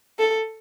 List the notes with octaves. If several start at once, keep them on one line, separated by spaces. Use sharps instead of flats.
A4